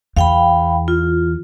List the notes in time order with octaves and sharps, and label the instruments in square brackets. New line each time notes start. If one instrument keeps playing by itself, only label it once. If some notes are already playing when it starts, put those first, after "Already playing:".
[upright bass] E2 [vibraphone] F5 G5 B5
[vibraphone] F4